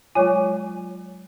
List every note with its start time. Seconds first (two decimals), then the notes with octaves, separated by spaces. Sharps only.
0.15 F#3 G#3 F4 C#5 G#5